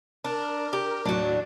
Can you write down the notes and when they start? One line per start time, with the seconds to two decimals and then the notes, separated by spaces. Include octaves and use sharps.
0.24 D4 A#4
0.73 G4
1.05 D#2 A2 F#3 D4 F#4